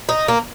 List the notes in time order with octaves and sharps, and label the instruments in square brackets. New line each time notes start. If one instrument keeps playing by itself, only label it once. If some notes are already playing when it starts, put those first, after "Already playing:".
[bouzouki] D#4
A#3